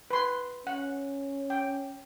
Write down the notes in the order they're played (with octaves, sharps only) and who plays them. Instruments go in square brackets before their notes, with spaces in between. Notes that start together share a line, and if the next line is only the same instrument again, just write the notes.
[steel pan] B4 C6
[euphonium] C#4 [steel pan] F#5
[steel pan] G5